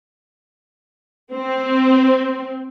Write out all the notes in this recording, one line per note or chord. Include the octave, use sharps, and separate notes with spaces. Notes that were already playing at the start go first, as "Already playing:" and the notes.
C4